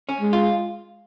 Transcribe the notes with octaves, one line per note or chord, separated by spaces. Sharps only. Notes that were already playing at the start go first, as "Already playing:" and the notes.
C#4
G#3
F4